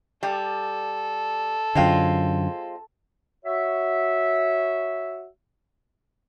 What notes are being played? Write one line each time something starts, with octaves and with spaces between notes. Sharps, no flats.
G3 A4
F#2 D3 G#3 C4 F4
F#4 C#5 E5